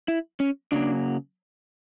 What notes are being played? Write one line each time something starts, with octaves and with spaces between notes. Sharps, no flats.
E4
C#4
C#3 F#3 A#3 D4